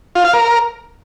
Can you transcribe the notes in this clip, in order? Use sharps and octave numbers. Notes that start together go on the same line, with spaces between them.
F4
F5
A#4